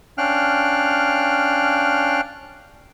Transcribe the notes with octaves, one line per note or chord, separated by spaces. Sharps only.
C#4 D4 F5 G5 F6 F#6